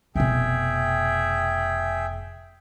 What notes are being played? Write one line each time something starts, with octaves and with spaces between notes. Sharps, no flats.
F1 B2 G#4 E5 G5